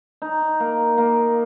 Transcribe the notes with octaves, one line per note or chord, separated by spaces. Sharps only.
D#4
A#3
A#3